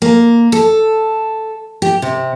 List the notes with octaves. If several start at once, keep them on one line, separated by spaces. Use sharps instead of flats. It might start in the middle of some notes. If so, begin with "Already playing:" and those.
A#3
A4
G4
C3